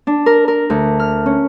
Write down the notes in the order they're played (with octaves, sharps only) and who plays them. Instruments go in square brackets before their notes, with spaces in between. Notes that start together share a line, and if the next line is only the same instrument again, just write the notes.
[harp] D4
A#4
A#4
D2
F6
C#4